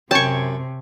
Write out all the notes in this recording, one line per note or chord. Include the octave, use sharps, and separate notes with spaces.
F#2 C3 C#5 G5 A5 C#6